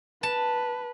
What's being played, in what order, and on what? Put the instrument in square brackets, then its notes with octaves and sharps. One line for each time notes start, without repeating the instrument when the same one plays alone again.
[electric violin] B4 [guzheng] A5